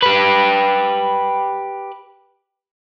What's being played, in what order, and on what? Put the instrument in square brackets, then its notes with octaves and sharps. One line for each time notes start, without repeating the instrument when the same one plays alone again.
[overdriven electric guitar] G4 B4